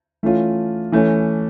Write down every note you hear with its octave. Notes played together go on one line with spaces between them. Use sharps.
E3 A3 C#4 F4
E3 A3 C#4